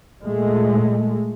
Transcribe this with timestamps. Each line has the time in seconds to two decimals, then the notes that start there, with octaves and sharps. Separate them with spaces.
0.23 A#2 G#3 A3